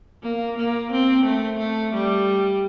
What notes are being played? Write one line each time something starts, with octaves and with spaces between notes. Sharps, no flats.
A#3
A#3
C4
A3
A3
G3